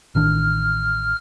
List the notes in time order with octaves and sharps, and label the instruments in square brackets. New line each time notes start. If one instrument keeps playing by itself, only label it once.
[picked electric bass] A1 D#3 D4 [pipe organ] F6